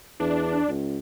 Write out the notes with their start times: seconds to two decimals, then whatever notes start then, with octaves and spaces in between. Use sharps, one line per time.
0.20 E2 D4
0.68 C#2